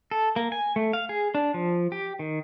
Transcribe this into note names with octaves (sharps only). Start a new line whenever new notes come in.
A4
A#3
G#5
A3
F5
G#4
D4
F3
G4
D#3